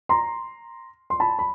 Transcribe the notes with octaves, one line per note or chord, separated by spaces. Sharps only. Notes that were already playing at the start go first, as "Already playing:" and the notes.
A#5 C6
C6
A5 B5
B5